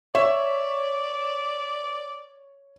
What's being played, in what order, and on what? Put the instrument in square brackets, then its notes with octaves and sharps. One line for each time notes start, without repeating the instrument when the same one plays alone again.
[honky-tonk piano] C#5 [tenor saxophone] D5 [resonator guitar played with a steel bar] E5